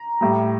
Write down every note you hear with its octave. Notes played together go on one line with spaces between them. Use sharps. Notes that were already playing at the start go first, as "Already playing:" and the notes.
Already playing: A#5
A2 G3